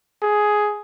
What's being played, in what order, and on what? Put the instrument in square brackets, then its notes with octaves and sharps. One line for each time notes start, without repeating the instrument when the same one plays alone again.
[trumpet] G#4